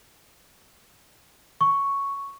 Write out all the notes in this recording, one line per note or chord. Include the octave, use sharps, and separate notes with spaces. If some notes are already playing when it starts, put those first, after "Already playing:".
C#6